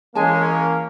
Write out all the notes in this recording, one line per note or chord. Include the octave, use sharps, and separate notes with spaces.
E3 G#3 A#3 C#4 G#5 A5
A#4